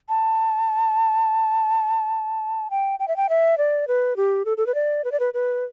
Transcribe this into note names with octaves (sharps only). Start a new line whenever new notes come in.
A5
G5
G5
E5
G5
E5
D5
B4
G4
A4
A4
B4
D5
B4
D5
B4
B4